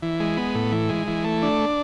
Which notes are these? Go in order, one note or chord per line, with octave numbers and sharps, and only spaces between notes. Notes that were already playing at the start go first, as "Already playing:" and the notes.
E3
G#3
B3
A2
E3
G#3
E3
A3
D4